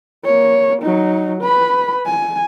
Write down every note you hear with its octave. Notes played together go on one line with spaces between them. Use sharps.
A#3 C#5
F#3 D#4
B4 B5
G#5